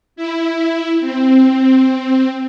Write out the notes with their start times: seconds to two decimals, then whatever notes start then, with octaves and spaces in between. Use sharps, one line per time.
0.16 E4
1.00 C4